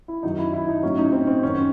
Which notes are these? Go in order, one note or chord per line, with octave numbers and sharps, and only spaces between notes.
E4
F#2 D#3 F#3 D#4
E4
E4
D#4
A2 F#3 C#4
D#4
C4
C4
F#2 D#3 F#3 C#4